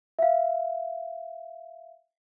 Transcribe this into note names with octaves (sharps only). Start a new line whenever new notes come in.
E5 F5